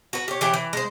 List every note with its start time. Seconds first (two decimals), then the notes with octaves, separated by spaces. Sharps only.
0.13 F#4 B4
0.28 G4 C#5
0.41 E3 G4 C#5 G5
0.54 E3
0.73 G#3 C5